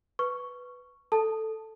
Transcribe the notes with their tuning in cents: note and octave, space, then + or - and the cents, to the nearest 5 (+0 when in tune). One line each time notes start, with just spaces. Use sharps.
B4 +0 C#6 +0
A4 +5 A5 +0